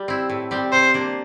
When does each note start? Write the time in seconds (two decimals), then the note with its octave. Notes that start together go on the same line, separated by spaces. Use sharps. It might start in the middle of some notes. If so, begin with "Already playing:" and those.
Already playing: G3
0.08 C4 E4
0.29 A2
0.51 G3 C4 G4
0.73 C3 C5
0.94 F3 A#3 D4